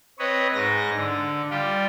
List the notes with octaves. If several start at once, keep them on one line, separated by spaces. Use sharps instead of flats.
C4 B4 C#5 D#5
G#2 D#5 A#6
D3
G3 F4 G4